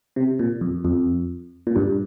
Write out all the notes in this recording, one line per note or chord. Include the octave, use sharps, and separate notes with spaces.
C3
A#2
F2
F2
A#2
G2